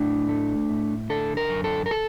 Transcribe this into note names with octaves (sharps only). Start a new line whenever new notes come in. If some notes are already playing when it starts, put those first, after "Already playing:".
Already playing: A2 D4
A3
A2
D3 A4
A#4
F#2
A4
A#4
A4